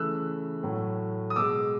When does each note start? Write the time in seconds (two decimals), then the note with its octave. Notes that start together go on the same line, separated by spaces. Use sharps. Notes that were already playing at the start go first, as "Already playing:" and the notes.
Already playing: C#3 E3 A3 E6 F#6
0.63 A2 F#3 A3
1.30 D#6
1.36 B2 G#3 D6 E6